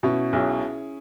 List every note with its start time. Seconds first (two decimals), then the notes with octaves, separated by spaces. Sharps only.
0.03 B2 C#4 E4
0.33 B1 E4 G#4